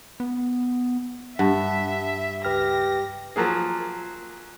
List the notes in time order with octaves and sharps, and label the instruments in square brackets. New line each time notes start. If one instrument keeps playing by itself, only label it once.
[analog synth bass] B3
[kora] G2 [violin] E5 [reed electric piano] F#5 A5
[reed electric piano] C#2 B4 F6 [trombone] G4 [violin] A#6
[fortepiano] F3 F#3 A#3 G#4